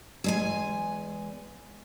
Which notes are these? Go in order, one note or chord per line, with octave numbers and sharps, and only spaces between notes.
E2 G#3 G#5